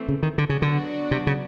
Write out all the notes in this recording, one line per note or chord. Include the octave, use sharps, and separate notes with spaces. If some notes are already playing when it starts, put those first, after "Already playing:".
Already playing: E3 A3 C4
C#3
D#3
D3
C#3 F#3 B3 D4 F#4
D3
C3
C#3